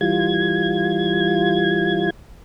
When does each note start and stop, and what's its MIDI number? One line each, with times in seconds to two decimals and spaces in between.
0.01 2.10 52
0.01 2.10 55
0.01 2.10 65
0.01 2.10 92